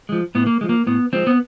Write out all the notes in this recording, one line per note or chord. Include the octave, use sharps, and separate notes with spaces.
F3 G#3
A2 B3
A#3
F3 G#3
A#3
A2 B3
F3 G#3 C4
B3